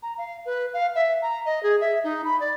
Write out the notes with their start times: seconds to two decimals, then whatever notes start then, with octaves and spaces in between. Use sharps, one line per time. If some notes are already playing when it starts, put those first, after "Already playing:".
0.02 A#5
0.18 F5
0.45 B4
0.74 F5
0.95 E5
1.22 A#5
1.46 D#5
1.63 G#4
1.81 E5
2.04 D#4
2.24 B5
2.40 D5